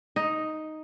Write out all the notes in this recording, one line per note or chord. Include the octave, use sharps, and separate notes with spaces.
D#4